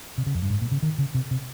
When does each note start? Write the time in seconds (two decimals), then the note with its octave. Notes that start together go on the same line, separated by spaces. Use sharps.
0.18 C3
0.26 C#3
0.34 F2
0.42 G2
0.50 G#2
0.61 A#2
0.71 C#3
0.82 D#3
0.98 C#3
1.15 C3
1.31 C3